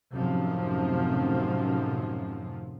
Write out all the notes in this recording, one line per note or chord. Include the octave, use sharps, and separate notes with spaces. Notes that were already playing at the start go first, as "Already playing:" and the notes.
F#2 A2 C3 D#3 F3